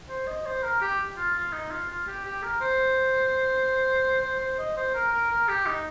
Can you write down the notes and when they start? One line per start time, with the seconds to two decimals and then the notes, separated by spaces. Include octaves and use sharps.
0.09 C5
0.27 D#5
0.46 C5
0.63 A#4
0.81 G4
1.17 F4
1.35 F4
1.52 D#4
1.71 F4
1.90 F4
2.06 G4
2.25 G4
2.43 A#4
2.60 C5
4.22 C5
4.40 C5
4.59 D#5
4.76 C5
4.94 A#4
5.12 A#4
5.30 A#4
5.48 G4
5.66 D#4